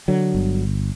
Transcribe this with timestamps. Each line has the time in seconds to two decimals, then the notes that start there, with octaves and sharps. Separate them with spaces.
0.08 D3 F#3
0.35 G1